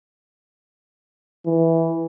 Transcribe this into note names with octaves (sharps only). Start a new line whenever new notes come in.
E3